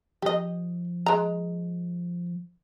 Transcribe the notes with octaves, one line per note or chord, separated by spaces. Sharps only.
F3 G4 D#5
G#3 A#5